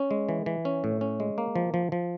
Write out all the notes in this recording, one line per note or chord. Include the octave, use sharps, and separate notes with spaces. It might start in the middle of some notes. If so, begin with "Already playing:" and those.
Already playing: C#4
G#3
E3
E3
C#4
A2
C#4
G#3
A#3
F3
F3
F3